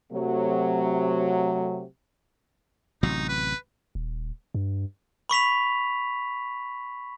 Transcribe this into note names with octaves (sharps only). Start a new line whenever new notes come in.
C3 F#3 A3
A1 C3 F#3 D#4
B4
D#1
G2
B5 C#6 B6 F7